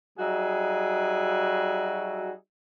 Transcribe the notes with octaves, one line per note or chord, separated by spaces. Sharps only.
F#3 G3 D#4 F#4 G#4 E5